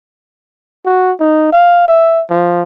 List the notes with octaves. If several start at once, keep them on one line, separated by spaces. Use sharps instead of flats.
F#4
D#4
F5
E5
F3